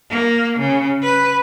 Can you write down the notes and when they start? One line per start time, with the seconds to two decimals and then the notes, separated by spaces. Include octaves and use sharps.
0.10 A#3
0.59 C#3
1.02 B4